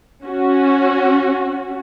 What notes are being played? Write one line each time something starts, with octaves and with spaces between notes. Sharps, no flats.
C#4 F#4